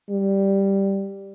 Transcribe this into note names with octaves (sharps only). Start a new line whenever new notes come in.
G3